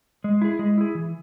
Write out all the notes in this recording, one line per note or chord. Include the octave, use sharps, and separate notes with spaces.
G#3
E4 G#4
G#3
E4 G#4
E3